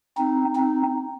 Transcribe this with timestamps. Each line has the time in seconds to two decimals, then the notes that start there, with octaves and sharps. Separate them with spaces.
0.17 C4 D#4
0.55 C4 D#4